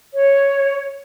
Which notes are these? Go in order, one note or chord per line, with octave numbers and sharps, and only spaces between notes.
C#5